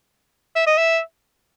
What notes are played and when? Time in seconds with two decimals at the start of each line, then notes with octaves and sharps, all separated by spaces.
0.56 E5
0.67 D#5
0.78 E5